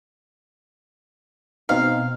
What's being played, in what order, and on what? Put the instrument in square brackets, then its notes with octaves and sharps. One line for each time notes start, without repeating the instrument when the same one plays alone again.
[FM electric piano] B2 C4 D#4 [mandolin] F5